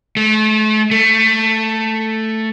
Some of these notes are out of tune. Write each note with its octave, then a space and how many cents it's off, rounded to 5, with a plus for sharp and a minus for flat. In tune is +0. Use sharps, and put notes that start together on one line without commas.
A3 -35
A3 +5